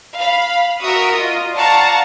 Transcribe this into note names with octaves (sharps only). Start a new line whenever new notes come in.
F5 B5
F#4 A#4 E5 C#6 D#6 E6
F4 D#5
D5 F5 F#5 A5 A#5 C#6